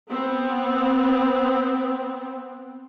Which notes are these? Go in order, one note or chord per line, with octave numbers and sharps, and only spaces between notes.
B3 C4